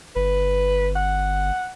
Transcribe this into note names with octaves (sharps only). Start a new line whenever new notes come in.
G1 B4
F#5